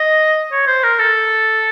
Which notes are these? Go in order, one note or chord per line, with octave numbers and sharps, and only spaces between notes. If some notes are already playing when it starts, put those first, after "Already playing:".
Already playing: D#5
C#5
C5
A#4
A4